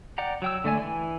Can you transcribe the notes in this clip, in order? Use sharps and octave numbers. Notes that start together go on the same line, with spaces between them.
D5 F#5 G5 A#5
F#3 G5 E6
D3 A3 D5 G#5
E3 G#5